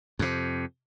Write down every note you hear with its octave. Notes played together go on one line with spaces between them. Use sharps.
F2 C3